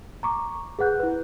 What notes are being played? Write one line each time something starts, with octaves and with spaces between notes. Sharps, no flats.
A#5 C#6 D6
G#4 B4 F#5 F#6 G6
E4 B4